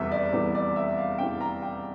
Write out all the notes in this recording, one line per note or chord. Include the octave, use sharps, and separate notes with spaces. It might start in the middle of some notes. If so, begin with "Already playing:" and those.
Already playing: F1 E2 E3 G3 E5
D5
F1 E2 E3 G3
D5
E5
F5
F1 E2 E3 G3 G5
A#5
G5